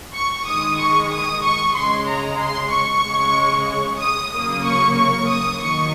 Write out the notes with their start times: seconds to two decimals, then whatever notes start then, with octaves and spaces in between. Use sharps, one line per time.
0.14 C#6
0.46 D#3 G#3 D#6
0.78 C#6
1.10 D#6
1.42 C#6
1.74 C#3 G#3 C6
2.07 A#5
2.39 C6
2.71 C#6
3.03 C#3 G#3
3.99 D#6
4.31 C#3 F#3 A#3 D#6
4.64 C#6
4.96 C#6
5.28 D#6
5.60 D#3 F#3 A#3 C#6